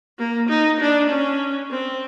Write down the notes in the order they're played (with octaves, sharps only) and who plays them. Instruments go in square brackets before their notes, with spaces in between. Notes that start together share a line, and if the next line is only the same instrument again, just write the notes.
[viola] A#3
D#4
D4
C#4
C4